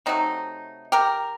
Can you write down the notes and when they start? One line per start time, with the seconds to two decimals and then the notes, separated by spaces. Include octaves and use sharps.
0.06 C3 F#3 A3 D#4
0.92 G4 A#4